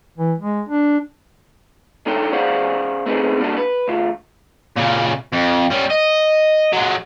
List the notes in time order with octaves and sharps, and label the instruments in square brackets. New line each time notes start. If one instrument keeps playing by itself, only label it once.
[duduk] E3
G#3
D4
[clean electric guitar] D3 D#4 A4 C#5 G5
C#4 G#4 C5 D5 F5 F#5
A3 C4 C#4 D#4 G#4 B4
G3 A#3 D4 F4 F#4 A4
B4
D2 F4
[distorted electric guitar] A#2 C#3
F2
G3 C#4
D#5
F#3 G#3